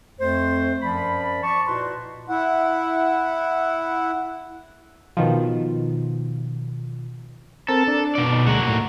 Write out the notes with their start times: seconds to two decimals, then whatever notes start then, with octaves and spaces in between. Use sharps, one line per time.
0.20 F2 A3 C5
0.82 F#2 F3 D5 B5
1.43 D5 A5 C#6
1.67 A#2 D#4 E4 F#4 B4 C6
2.29 E4 F#5
5.17 B2 D#3 F3
7.68 C4 A4 A#4 A5
7.88 D4
8.15 B2 D5
8.32 D#4
8.47 D2 G#3 A#3 F#4
8.67 A2